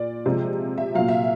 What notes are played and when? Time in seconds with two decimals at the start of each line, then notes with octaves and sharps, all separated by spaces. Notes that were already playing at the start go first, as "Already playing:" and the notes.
Already playing: A#2 D5
0.26 C3 F3 G#3
0.78 E5
0.95 A#2 F#3 F5
1.08 E5